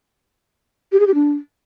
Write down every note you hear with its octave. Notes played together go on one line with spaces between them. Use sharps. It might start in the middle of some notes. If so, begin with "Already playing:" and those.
G4
G#4
G4
D4